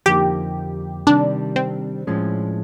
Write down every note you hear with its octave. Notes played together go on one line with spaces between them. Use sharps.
F2 D3 F3 A#3 D#4 G4
C3 D#3 G3 D4
C4
A2 F3 G#3 C#4